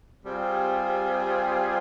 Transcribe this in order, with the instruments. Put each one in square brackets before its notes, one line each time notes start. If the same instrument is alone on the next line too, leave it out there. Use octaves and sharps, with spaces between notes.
[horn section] C3 G3 C4 F4 G#4